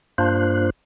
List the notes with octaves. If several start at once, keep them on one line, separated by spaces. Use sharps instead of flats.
G2 A#3 D4 F4 C5 F#6